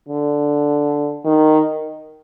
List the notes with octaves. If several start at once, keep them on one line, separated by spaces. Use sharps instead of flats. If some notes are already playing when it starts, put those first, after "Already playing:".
D3
D#3